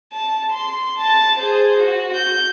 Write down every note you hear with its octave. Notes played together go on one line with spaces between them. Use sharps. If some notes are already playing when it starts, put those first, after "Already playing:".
A5
C6
A5 A6
G#4 C5
F#4
G6